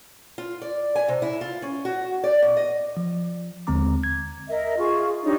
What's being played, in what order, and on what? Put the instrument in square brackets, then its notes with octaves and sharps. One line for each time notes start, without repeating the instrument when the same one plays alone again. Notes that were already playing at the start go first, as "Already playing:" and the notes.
[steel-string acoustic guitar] F4
D5
G#5
C3
E4
F4
C#4
F#4
D5
B2
D#5
[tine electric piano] F3
D#2 D3 G#3 C4 A#5 D6
G#6
[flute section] A#4 D#5 E5
F4 G#4 C#6
D4 D#4 G4 C#5